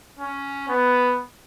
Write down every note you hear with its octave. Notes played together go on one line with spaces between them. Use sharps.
C#4
B3